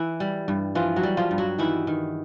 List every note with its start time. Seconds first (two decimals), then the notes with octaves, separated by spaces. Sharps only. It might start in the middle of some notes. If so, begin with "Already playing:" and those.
Already playing: E3 E4
0.20 G3
0.48 G2
0.75 E3 F3 F4
0.96 F#3 F#4
1.03 G3
1.17 F3 F4
1.31 G2
1.38 F#3 F#4
1.58 D#3 E3 E4
1.87 D#3